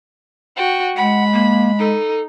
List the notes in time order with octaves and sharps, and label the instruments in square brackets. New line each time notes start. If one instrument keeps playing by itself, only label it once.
[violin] F#4 G5
[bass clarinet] G#3 [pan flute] F#5 [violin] B5
[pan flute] A#3
[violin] D#4 [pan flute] A4